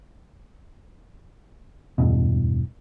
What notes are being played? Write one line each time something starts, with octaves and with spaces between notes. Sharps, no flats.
D1 E2 G2 B2